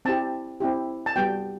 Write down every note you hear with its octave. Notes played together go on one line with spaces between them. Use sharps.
C4 E4 G4 A5
C4 E4 G4
A5
G3 B3 F#4 G5